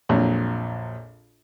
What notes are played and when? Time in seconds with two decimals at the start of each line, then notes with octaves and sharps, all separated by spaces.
0.09 A#1 F2 A#2 F#3